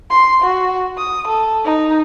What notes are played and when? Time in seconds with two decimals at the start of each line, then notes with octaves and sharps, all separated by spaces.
0.10 C6
0.42 F#4
0.98 D#6
1.28 A4
1.65 D#4